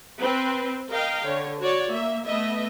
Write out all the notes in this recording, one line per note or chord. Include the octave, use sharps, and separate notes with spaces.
C4 B4
A#4 D#5 F5 G5
D3 C#5
F#4 C#5 D5
A#3 E5
A3 B3 D#5 E5